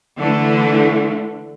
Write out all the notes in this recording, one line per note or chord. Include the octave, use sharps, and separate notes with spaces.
D3 E3 A3